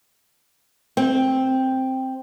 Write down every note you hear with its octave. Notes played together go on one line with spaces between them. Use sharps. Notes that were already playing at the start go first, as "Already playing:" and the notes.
C4